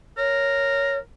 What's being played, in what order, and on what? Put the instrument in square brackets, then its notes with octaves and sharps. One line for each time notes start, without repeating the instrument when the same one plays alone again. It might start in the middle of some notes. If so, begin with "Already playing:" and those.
[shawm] A#4 [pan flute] C#5